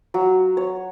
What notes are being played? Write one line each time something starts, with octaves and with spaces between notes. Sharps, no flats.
F#3
C#5